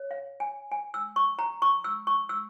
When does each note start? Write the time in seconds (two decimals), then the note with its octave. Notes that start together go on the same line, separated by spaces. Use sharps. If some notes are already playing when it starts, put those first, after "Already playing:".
Already playing: C#5
0.11 F5
0.40 G#5
0.72 G#5
0.94 E6
1.16 C#6
1.39 A#5
1.62 C#6
1.84 E6
2.07 C#6
2.29 E6